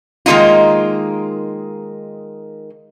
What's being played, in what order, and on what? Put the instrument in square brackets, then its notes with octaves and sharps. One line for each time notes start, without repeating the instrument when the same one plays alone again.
[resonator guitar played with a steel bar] D#3 G#3 A#3 D#4 F4